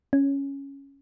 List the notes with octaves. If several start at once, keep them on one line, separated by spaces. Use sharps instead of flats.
C#4